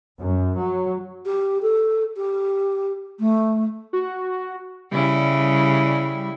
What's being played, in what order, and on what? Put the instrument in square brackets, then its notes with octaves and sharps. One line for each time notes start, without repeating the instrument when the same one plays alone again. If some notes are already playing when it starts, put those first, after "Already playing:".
[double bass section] F#2
F#3
[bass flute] G4
A4
G4
A3
[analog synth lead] F#4
[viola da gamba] C#3 E4 [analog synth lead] G3